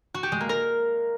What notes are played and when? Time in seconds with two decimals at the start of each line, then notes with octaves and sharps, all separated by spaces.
0.14 F#4
0.23 G4
0.32 G#3
0.41 A#3
0.49 A#4